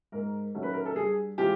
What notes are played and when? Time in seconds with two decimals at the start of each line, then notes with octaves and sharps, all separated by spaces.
0.12 G#2 A#4
0.54 D#3 F#3 A3 C#4
0.63 B4
0.73 A#4
0.86 A4
0.96 G2 G#4
1.38 E3 G#3 C4 F4 G4